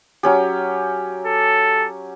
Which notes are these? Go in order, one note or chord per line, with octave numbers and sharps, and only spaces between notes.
F#3 C#4 G4
A4